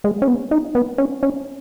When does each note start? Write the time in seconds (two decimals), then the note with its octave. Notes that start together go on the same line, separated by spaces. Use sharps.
0.04 G#3
0.22 C#4
0.28 B3
0.51 D#4
0.75 B3
0.98 C#4
1.23 C#4